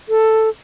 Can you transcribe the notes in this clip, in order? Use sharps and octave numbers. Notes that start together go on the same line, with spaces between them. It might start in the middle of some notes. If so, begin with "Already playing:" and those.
A4